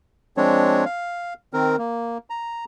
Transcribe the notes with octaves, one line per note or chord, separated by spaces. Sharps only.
F3 G#3 C4 D4 C#5
F5
D#3 C4 A#4
A#3
A#5